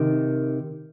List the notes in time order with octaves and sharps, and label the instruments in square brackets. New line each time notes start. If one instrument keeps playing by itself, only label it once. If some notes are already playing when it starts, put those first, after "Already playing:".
Already playing: [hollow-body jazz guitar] C3 D#3